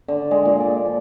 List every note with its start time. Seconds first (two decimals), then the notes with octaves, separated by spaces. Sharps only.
0.08 D3
0.31 G#3
0.45 A#2
0.60 D5
0.86 F3